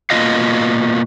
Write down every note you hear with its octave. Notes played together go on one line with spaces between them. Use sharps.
B2 A#3 F4 D#5 F5